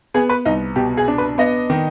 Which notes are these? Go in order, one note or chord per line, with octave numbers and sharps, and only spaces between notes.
B3 G#4
B4
C2 D#4
B2 G4
G#4
D4
B4
B3 D#5
D#3